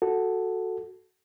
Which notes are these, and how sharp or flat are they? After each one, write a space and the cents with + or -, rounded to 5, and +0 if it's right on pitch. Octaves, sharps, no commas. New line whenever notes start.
F#4 +0 A4 +0